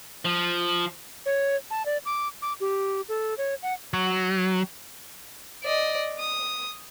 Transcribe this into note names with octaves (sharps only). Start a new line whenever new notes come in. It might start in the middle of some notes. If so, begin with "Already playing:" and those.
F3
C#5
A5
D5
D6
D6
G4
A4
C#5
F#5
F#3
D5 D#5
D#6